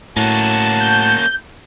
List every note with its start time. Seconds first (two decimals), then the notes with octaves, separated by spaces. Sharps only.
0.17 A2 A#3 C#4 F#4 A5
0.81 G6